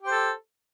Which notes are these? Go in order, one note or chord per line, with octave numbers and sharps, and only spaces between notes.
G4 A4 C5